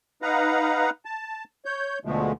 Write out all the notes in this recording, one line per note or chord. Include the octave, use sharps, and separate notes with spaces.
D#4 B4 F5 F#5 A#5
A5
C#5 G6
D2 B2 D3 F3 G#3 A3